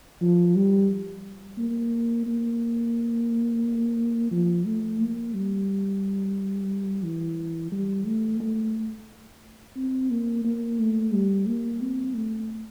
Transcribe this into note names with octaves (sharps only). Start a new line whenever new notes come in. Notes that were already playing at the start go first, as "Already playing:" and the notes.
F3
G3
A#3
A#3
F3
A3
A#3
G3
E3
G3
A3
A3
C4
A#3
A#3
A3
G3
A#3
C4
A3